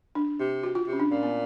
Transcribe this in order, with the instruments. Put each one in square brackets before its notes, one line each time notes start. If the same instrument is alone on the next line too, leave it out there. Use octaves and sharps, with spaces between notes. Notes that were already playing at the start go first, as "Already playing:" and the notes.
[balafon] D4
[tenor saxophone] C3
[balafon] F#4
F4
[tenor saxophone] C3
[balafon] C#4
D4
[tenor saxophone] A#2 [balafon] C#4
[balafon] B3